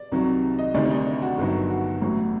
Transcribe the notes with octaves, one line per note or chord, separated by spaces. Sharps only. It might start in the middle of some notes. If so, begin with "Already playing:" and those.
Already playing: D5
C2 C3 D#3 F#3
D#5
D2 C3 D#3 G3 D5
D4
D#4
D4
F#4
G1 G2 D#3 F#3
F#4
A1 A2 F#3